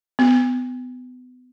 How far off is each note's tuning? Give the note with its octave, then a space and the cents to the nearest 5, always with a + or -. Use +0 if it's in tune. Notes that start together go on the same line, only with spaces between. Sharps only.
B3 +30